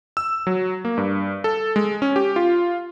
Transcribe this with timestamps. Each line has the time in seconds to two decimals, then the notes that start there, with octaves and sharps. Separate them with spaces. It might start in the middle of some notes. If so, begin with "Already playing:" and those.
0.17 E6
0.47 F#3
0.85 A#3
0.98 G2
1.44 A4
1.76 G#3
2.02 C#4
2.16 G4
2.36 F4